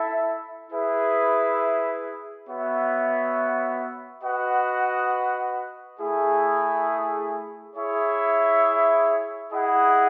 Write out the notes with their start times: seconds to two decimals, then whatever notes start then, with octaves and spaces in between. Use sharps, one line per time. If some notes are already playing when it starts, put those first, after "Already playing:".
Already playing: E4 A4 E5
0.71 E4 G#4 B4 E5
2.48 B3 F#4 C#5 E5
4.23 F#4 B4 D#5 F#5
5.99 A3 E4 G#4
7.76 E4 G#4 C#5 E5
9.52 E4 G#4 D#5 F#5